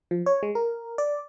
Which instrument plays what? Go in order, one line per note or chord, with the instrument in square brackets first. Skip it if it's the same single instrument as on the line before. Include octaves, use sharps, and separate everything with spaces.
[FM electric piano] F3
C#5
G#3
A#4
D5